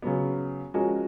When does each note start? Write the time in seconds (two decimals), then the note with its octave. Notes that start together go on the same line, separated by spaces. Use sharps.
0.02 C#3 F#3 B3
0.74 F3 G#3 C#4 F#4 A#4